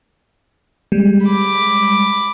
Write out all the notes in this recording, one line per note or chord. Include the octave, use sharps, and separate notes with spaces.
G3 G#3
B5 D6